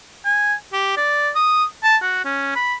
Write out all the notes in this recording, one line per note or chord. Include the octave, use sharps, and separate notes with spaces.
G#5
G4
D5
D#6
A5
F#4
C#4
B5